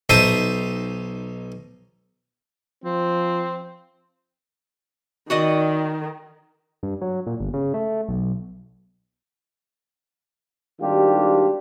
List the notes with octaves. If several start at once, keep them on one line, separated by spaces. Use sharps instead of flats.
B1 D#4 C5 E5 A5 D#6
F3 C4
D#3 F#4 D5 D#5
G2
F#3
A#2
G1
C#3
A3
B1
G#1 D#3 G3 D4 F4 G4